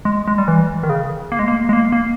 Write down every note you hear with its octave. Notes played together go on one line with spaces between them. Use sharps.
G#3
G#3
G3
E3
D#3
C#3
A#3
G#3
A#3
G#3
A#3
A#3